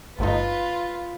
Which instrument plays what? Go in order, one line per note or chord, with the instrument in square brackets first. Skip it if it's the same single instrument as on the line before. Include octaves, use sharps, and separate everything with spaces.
[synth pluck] G1 A3 D#4 [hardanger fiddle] F4 B4